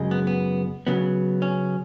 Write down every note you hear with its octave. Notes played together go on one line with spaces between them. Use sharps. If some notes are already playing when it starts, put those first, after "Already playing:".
Already playing: F#2 C#3 G#3
B3
B3
C#3 F#3 B3
C#4